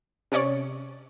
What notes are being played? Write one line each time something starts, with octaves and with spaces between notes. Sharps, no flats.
C3 C#4 C#5 D5 C#6